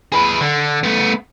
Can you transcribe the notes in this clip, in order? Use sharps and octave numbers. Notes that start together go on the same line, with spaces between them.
G#4 B4
D3
A3 B3